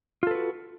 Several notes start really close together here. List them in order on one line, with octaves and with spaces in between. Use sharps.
F4 A4 B4 F#4